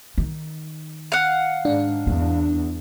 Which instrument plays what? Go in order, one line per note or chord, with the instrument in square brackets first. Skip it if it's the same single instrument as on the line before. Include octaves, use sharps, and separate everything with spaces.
[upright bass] D#3
[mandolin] F5 F#5
[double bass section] G#2 [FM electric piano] D4
[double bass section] E2 [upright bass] C#4